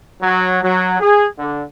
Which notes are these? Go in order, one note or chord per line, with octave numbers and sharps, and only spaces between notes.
F#3
F#3
G#4
D3